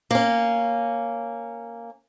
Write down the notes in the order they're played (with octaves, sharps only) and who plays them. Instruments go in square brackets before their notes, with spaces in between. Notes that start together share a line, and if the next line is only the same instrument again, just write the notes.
[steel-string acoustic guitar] A#3 C#4